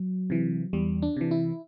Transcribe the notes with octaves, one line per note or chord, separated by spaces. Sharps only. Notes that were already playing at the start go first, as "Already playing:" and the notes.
Already playing: F#3
C3 E3
E2 G3
D4
C3 E3
E4